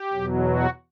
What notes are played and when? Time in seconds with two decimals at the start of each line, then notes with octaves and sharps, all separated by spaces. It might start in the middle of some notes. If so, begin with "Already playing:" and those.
Already playing: G4
0.13 E2 B2 F#3
0.46 F#4